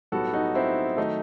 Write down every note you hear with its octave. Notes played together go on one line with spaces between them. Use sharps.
B1 A2 G3 B3 F#4 A4
D#4 F#4
C4 E4
D#3 F#3 A3 D#4